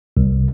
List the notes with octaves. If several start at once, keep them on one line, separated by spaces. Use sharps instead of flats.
C2